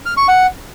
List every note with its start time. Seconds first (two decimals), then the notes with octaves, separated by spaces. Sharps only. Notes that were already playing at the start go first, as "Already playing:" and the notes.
0.06 F6
0.17 C#6
0.28 F#5